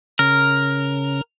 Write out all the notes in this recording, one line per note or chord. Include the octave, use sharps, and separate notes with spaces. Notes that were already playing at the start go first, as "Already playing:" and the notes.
C#3 A#4